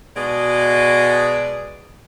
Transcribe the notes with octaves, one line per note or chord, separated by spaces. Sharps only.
B2 G#3 F#4 G#4 B4 D5